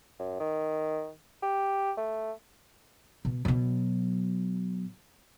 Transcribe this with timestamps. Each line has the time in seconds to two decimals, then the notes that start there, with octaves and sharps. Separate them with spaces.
0.19 F#2
0.40 D#3
1.42 G4
1.97 A3
3.25 B2
3.45 B2 F#3